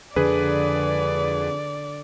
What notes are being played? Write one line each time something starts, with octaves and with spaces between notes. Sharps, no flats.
F2 D3 D4 G#4 B4 D5